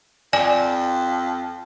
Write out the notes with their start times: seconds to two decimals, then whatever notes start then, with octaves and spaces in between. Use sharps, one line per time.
0.33 F2 D5 G#5